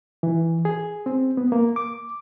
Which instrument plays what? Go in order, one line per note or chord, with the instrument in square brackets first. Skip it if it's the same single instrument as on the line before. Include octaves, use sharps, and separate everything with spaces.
[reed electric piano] E3
G#4
C4
B3
A#3
D6